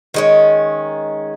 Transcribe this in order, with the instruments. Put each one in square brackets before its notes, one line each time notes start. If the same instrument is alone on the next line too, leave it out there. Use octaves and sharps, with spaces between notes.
[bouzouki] D#3 G#3 C#4